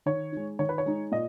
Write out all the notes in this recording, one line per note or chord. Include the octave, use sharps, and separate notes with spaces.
D#3 C#5
G#3 D#4
D#3 C#5
B4
C#5
G#3 D#4
A#2 D#5